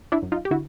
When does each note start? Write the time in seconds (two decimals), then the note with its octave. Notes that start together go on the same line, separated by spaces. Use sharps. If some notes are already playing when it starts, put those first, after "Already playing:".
0.12 D4 E4
0.22 F#2
0.32 D#4 F4
0.45 G4
0.51 D3 E4 F#4